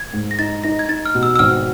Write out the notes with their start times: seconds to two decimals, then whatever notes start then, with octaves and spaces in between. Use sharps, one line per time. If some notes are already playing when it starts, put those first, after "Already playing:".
Already playing: G#6
0.13 G#2
0.31 A#6
0.39 D#4 A6
0.64 D#4 A#6
0.79 G#6
0.89 D#4 A6
1.05 F6
1.15 B2
1.23 E6
1.36 E6
1.39 G#1 F6